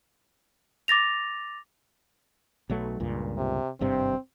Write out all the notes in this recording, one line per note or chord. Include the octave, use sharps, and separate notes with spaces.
D6 A6 A#6 F7
B1 F#3 A3
C#2 G2 A#2
C3
G#1 G2 C3 C4